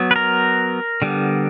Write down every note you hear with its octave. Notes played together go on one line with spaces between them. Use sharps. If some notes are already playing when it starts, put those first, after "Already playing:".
Already playing: F#3 B3
B4
A#4
D3 G3 B3